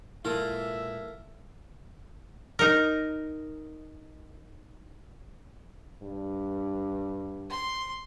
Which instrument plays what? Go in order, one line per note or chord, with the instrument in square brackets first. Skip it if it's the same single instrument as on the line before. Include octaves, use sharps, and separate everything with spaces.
[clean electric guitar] A#2 E3 G#3 [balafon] E4 [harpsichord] F4 A4 A#4 [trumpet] E5
[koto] D#4 A#4
[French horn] G2
[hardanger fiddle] C6